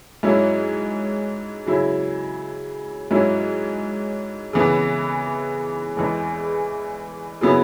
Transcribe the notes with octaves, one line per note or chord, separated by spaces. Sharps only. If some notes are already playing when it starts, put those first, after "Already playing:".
G#2 F#3 C#4 E4
C#3 F#3 E4
G#2 F#3 C#4 E4
C#3 E3 B3
E2 E3 G#3
C#3 F#3 B3 E4